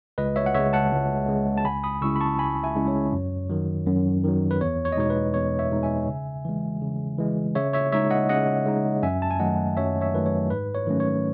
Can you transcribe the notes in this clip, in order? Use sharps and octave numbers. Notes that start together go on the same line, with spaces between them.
C#2 B4 D#5
C#5 E5
F#5
C#3 G#3 C#5 E5
F#5 A5
C#2
C#3 G#3
A5
C#2 G#5 B5
B5 D#6
C#3 G#3 C#4 E4 C#6 E6
B5
A5 C#6
C#2 G#5 B5
E5 G#5
C#3 G#3 C#4 E4
C#5
F#2
D#3 F#3
F#2
D#3 F#3
B4
E2 C#5
C#5
D#5
B2 G#3 D#4 C#5
B4
E2 C#5
C#5 E5
B2 G#3 D#4
E5 G#5
C#3
E3 G#3
C#3
E3 G#3
C#3 C#5 E5
C#5 E5
G#3 D#4 C#5 E5
D#5 F#5
C#3 D#5 F#5
G#3 D#4
F#2 E5 G#5
A5
G#5
D#3 F#3 A3 D#5 F#5
F#2 C#5 E5
C#5 E5
D#3 F#3 A3 B4
C#5
G#2 B4
C#5
D#3 F#3 A3 C#4
C#5